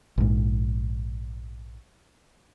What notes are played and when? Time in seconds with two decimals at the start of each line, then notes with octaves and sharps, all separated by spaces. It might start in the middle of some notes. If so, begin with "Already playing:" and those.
0.18 A#1 G#2